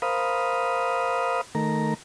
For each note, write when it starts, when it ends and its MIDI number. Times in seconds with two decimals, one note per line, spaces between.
0.02 1.41 70
0.02 1.41 72
0.02 1.41 77
0.02 1.41 83
0.02 1.41 87
1.55 1.94 51
1.55 1.94 57
1.55 1.94 70
1.55 1.94 82